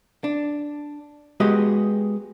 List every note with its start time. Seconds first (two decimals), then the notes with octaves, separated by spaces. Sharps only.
0.24 D4
1.40 G#3 B3 F#4 G4 D#5